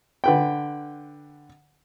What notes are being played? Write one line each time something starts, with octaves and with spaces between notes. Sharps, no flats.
D3 B4 G5